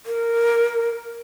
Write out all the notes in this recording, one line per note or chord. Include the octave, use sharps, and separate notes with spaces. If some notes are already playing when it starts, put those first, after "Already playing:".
A#4